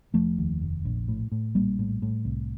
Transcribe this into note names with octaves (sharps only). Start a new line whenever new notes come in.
F1 F3 A3
D#2
F1
A#1
A2
A2
A#1 G3 A#3
A2
A2
C2